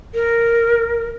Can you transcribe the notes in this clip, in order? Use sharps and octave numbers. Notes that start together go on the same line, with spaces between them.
A#4